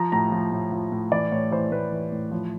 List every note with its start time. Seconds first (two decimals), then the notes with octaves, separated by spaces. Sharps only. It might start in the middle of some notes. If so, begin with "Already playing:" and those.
Already playing: F3 A#5
0.12 A2 A#5
0.32 F3
0.52 A2
0.72 F3
0.92 A2
1.12 E3 D5
1.32 A2 C#5
1.52 E3 C5
1.72 A2 B4
1.92 E3
2.12 A2
2.31 F3